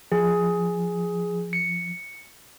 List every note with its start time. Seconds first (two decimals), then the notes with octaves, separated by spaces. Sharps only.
0.12 F3 G#4
1.53 C#7